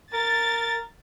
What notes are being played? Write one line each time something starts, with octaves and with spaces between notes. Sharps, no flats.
A#4 A6